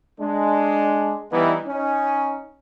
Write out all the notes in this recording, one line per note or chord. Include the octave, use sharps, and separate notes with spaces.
G#3 D4
E3 G3 B3 D#4 E4
C#4 D#4